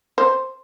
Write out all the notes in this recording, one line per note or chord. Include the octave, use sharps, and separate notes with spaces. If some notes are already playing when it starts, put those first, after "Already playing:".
C5